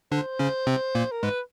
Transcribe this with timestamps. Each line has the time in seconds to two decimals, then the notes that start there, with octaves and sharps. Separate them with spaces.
0.12 D3 D4 C5
0.39 C#3 C#4
0.67 C3 C4
0.95 A#2 A#3
1.12 A#4
1.23 G#2 G#3 B4